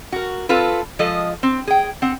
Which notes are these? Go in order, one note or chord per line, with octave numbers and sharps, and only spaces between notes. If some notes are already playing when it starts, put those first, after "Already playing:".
F#4 A#4
C4 F4 A4 B4
F3 G#3 A4 D#5
C4
G#4 G5
C4 F#5